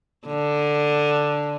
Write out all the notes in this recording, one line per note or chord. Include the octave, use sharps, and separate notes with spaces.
D3